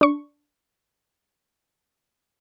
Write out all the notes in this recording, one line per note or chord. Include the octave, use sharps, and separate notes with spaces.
D4 C#6